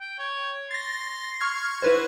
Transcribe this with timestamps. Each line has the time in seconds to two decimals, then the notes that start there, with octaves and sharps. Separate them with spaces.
0.01 G5
0.19 C#5
0.71 C6 A6 A#6
1.41 C#6 F6 G#6
1.82 E4 F#4 B4 C5